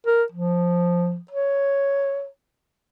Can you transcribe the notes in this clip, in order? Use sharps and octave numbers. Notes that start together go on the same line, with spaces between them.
A#4
F3
C#5